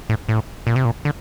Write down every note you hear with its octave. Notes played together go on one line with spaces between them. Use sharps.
A2
A2
A#2
C3
A#2
D3